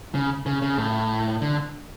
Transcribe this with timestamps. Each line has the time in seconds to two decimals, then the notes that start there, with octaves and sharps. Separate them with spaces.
0.15 C#3
0.46 C#3
0.62 C#3
0.78 A2
1.41 D3